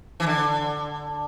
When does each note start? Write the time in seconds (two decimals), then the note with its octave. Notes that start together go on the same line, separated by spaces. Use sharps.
0.20 E3
0.27 D3